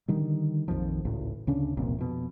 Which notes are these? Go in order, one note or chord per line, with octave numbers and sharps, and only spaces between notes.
D3 D#3 G3
A#1 F2 D#3 F3
G#1 C#2 A2
D2 C#3 C#4 D4
E1 C2 A#2
F2 B2